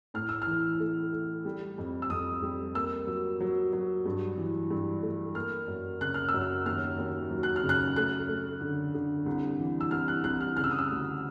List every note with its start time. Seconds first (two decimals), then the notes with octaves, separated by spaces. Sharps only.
0.14 A2 F6
0.29 E6
0.42 E3 F6
0.80 A3
1.12 A3
1.45 G3
1.78 F2
2.02 E6
2.10 F2 D#6
2.43 G3
2.75 A#3 E6
3.07 F#3
3.40 F#3
3.73 F#3
4.06 G2
4.37 E3
4.71 G2
5.03 A3
5.35 A#3 F6
5.68 F#2
6.01 C#3 F#6
6.14 F6
6.29 E6
6.34 F#2
6.41 F6
6.65 D#2 F6
6.99 D#2
7.30 F#3
7.43 F#6
7.56 F6
7.63 C#3
7.69 F#6
7.96 A3 F#6
8.29 A3
8.61 D3
8.94 D3
9.26 C2
9.59 E3
9.81 E6
9.91 C2 F6
10.08 F#6
10.24 C2 F#6
10.41 F6
10.57 C#3 F6
10.64 E6
10.71 D#6
10.79 E6
10.90 D2